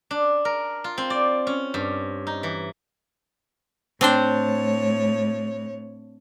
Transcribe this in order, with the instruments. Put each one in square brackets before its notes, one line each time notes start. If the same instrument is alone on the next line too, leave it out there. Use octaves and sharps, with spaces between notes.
[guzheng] D4
A#4
F4
C4
D5
C#4
G2
D#4
E3
[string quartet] A2 C#5 [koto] C4 D4 C5